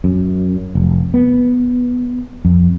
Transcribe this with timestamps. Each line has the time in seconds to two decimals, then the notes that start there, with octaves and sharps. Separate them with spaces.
0.04 F#2
0.75 F1
1.14 B3
2.45 F2